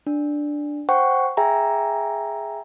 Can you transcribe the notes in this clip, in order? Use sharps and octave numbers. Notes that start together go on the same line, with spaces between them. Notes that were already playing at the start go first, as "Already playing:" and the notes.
D4
C5 F#5 G5 C#6
G#4 E5 G5 G#5 A#5